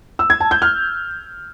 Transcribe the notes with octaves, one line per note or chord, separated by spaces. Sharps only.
E6
G#6
A5
G6
F6